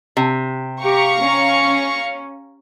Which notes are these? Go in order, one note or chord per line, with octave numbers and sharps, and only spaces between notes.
C3
G4 F5 A#5 C#6
C#4